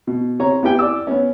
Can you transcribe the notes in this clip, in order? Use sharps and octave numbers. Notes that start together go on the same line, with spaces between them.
B2
C3 C#5 A#5
B3 E4 G4 G5 G#5
D5 D6 E6
B3 C#4